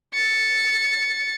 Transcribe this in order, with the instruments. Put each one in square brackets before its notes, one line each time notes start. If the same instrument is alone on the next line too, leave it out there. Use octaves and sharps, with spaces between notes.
[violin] A6 C#7